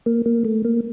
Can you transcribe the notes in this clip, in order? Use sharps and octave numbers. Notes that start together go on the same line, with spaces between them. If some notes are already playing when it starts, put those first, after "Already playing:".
A#3
A#3
A3
A#3